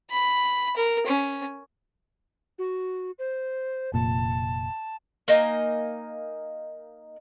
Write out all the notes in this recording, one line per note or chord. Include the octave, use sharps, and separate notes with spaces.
B5
A#4
C#4
F#4
C5
F1 A#2 A5
A#3 D#4 D#5 G#5